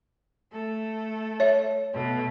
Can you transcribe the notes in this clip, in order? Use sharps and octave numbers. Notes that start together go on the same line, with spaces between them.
A3 A4
C#5 E5
B2 A3